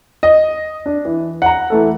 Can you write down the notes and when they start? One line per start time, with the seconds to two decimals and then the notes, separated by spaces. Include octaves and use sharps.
0.23 D#5
0.86 D4
1.05 E3
1.42 F#5 A#5
1.70 E3 A3 A4